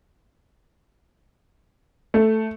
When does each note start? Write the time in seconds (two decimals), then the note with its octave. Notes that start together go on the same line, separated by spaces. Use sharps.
2.14 A3